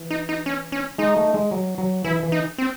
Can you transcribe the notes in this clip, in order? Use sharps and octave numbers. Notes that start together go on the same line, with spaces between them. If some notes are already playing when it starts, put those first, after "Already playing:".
Already playing: E3
D#4
D#4
C#4
C#4
G#3 D#4
A3
G#3
F#3
F#3
E3 E4
E3
D#4
C4